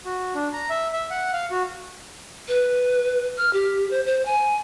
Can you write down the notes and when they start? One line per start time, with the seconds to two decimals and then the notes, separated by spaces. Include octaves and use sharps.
0.05 F#4
0.34 D4
0.53 A#5
0.70 E5
0.93 E5
1.11 F#5
1.33 F5
1.51 F#4
2.48 B4
3.37 F6
3.53 G4
3.91 C5
4.06 C5
4.25 G#5